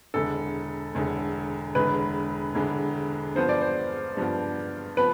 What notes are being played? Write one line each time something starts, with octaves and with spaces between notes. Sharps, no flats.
E1 E2 D3 A4
E1 E2 D3
E1 E2 D3 B4
E1 E2 D3
G2 F3 B3 C5
D5
C5
G2 F3 B3
F3 B3 B4